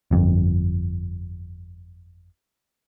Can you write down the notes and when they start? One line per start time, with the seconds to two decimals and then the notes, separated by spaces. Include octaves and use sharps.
0.11 G1 F2